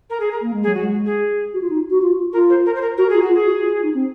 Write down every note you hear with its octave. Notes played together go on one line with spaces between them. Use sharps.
A#4
G#4
A#4
A#3
G#3
F#3 G#4
G#3 F#4
G#4
F#4
F4
D#4
F#4
F4
F4 A#4
C5
A#4
C5
A#4
F#4 A#4
F4 G#4
F#4
F4
G#4
F#4
F4
D#4
C4